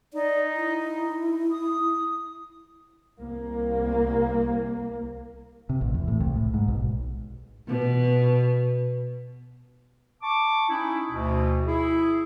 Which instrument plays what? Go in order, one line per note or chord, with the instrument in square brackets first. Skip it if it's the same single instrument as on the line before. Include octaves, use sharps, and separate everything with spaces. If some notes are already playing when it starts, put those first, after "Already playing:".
[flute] D#4 [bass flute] D5
[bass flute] E4
[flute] D#6
[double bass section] C2 A#3
[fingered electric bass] C3
A1
E2
A2
C2
A2
G#2
B1
[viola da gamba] B2
[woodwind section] A5 C#6 D6
C#4 D#4 E4
D2 B2
E4 G#4